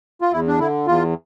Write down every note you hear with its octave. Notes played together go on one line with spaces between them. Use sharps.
F4
E2 E4
D4
D3 E4
E2 F4